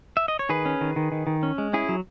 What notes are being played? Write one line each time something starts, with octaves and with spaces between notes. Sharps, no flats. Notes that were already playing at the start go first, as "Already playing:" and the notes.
E5
D#5
C#5
D#3 G#4 B4
C#4
D#3
D#3
D#3
D#3
C#4
G#3
C#4 E4 G#4
F#3